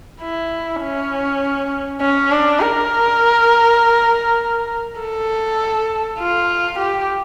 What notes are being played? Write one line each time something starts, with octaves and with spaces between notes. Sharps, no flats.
E4
C#4
C#4
D4
A#4
A4
F4
G4